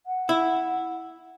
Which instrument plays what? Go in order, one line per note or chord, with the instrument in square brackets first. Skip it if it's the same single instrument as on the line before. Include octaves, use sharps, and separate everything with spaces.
[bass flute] F#5
[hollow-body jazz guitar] E4